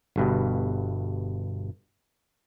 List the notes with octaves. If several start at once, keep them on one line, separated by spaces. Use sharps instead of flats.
G1 G2 B2